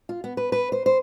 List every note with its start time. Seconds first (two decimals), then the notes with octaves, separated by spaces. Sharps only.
0.09 F4
0.24 B3
0.37 B4
0.52 B4
0.72 C5
0.86 C5